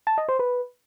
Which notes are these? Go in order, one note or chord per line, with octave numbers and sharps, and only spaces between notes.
A5
D#5
C5
B4